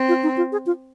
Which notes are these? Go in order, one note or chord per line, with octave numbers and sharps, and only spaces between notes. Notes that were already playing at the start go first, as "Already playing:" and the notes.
Already playing: C4
F4
D#4
F4
G#4
F4